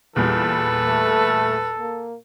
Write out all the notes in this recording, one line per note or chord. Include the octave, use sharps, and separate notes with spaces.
E2 A#2 E3 G3 A4 B4
A3
A#3